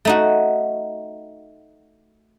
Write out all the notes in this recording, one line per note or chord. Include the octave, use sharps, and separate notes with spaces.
A3 D#4 F#4